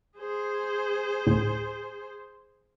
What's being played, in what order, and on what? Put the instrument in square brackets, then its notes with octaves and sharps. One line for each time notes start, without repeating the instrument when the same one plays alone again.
[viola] G#4 C5
[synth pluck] D2 A2